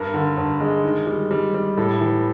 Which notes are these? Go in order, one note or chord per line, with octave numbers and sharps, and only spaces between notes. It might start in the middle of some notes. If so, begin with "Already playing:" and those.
Already playing: G2 A#4
D3
G2
G#3
D#3
G3
G3
G3
A2 A4
E3